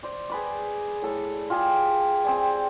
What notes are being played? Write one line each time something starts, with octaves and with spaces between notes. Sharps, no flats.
C5 D5
G#4 B4 D5
A2 A4
F4 G4 G#4 A5
C4 G#4 D5